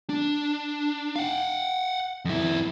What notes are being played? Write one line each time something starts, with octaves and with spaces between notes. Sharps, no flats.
D4
F5 F#5
F2 E4